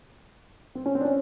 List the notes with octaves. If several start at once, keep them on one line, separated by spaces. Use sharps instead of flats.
C4
C#4
C4
D4
C#4